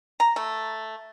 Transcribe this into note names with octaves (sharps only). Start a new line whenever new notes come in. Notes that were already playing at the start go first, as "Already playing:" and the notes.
A#5
A3